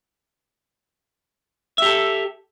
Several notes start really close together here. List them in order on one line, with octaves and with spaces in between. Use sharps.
E5 G4 A4